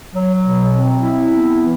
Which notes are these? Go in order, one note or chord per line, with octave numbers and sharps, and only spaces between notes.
F#3
B2
C4
E4
B3
E3